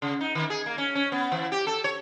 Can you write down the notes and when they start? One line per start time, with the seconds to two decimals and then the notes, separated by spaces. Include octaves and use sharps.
0.02 C#3
0.21 D#4
0.35 D#3
0.50 G#4
0.66 A#3
0.78 C#4
0.95 C#4
1.12 B3
1.32 E3
1.52 G4
1.67 A4
1.84 C#5